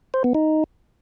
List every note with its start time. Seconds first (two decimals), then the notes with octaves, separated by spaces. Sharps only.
0.14 C5
0.24 B3
0.35 D#4